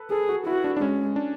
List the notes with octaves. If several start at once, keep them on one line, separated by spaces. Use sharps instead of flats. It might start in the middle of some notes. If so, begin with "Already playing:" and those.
Already playing: A4 B4
G#4 A4
F#4
E4 F#4
D4
D4
G#3 C#4
D4